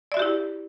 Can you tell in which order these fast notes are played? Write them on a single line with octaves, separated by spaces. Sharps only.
D5 E5 F#4 G4 E4